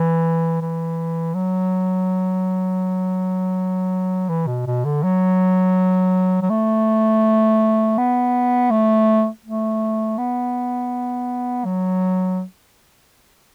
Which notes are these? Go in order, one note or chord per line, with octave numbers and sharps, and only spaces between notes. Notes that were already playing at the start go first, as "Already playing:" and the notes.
Already playing: E3
E3
F#3
E3
B2
B2
D3
F#3
F#3
A3
B3
A3
A3
B3
F#3